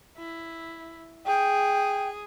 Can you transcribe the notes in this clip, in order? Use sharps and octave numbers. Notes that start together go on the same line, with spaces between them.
E4
G#4 G5